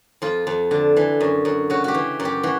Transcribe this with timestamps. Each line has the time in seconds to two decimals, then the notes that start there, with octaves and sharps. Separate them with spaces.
0.22 F2 F4
0.47 F2
0.71 D3
0.97 E3
1.20 F#2
1.45 F#2
1.70 C#3 F#4
1.84 F#4 G4
1.94 E3
2.20 F#2
2.25 G4
2.43 E3 F#4